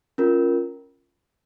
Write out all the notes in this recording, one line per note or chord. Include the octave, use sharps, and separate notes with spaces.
C#4 F4 A#4